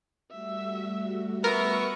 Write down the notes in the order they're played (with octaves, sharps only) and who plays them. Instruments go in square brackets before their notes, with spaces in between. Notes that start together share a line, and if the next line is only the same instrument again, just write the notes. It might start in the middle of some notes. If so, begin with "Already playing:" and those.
[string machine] G3 A3 F#4 [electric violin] E5
[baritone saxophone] B3 [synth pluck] A#4 [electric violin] E5 C#6